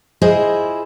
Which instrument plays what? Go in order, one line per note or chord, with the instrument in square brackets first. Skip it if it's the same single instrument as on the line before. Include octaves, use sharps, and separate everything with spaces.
[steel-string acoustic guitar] E4 F4 G#4 C5 D#5